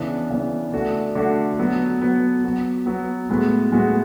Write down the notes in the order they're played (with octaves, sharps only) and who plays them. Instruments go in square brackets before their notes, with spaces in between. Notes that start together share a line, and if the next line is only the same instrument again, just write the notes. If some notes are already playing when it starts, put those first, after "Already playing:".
Already playing: [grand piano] C#3 E3 B3 D4
C#3 E3 B3 D4
D3 A3 D4 F#4
D3 A3 D4 F#4
F#3 B3 F#4
F#3 B3 F#4
F#3 B3 F#4
F#3 B3 F#4
A2 G#3 B3 F#4
A2 G#3 B3 F#4